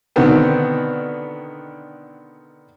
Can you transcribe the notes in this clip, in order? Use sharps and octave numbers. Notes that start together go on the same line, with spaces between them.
B2 D3 D#3 B3 C4